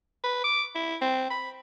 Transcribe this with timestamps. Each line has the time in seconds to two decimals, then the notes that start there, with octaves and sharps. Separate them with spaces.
0.24 B4
0.44 D6
0.75 E4
1.01 C4
1.30 B5